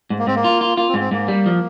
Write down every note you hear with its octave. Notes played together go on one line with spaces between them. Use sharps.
G#2
A#3
G#2 C4
A#3
F4
F4
A#3 F4
C4
G#2
C4
G#2 A#3
G3
F3